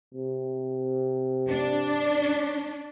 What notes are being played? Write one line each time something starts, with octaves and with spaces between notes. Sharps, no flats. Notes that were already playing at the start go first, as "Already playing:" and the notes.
C3
D4